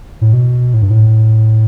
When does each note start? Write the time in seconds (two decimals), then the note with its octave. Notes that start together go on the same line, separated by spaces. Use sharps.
0.21 A2
0.33 B2
0.74 A2
0.82 G2
0.90 A2